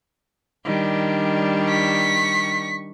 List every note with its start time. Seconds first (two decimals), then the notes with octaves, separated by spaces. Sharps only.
0.65 D#3 G3 D4
1.65 C#6 B6